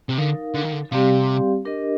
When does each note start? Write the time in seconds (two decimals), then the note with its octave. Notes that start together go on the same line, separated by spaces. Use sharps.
0.09 C3
0.18 D3 D#4 A#4 F5
0.55 D3
0.64 D#3
0.72 D3
0.91 C3 G3 C4 G4 D5 F5
1.65 D4 G4 A#4 D#5